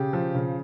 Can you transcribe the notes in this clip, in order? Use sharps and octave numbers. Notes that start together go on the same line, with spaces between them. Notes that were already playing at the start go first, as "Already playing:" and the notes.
Already playing: C#3 G4
F3
C#3